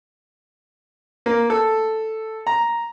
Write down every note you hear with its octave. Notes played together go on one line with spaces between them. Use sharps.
A#3
A4
A#5